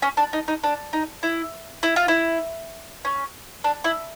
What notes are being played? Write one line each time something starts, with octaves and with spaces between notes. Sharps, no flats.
C#4
D4
D#4
D#4
D4
D#4
E4
E4
F4
E4
C#4
D4
E4